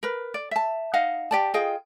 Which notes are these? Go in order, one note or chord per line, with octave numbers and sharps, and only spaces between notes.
A#4 B4
D5
E5 A5
D#4 D#5 F5 F#5
G4 D5 A5
F4 G#4 D#5 G5